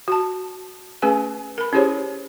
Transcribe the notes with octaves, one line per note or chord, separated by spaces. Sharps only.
F#4 A5
A3 C#4 G#4 B4 G#5
A#4 B5
C#4 E4 G4 G#4 C5 C#5